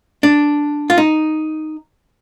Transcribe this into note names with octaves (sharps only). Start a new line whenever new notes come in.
D4
F4
D#4